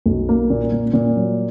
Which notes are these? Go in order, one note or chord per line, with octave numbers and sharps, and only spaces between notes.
B1
A#3
A#2
A#2
A#2
F#3